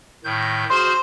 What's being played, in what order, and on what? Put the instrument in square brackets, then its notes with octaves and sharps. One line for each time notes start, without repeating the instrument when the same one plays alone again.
[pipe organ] A2 D#3 G6
[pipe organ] F#4 G#4 F6 [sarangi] C5 [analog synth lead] C6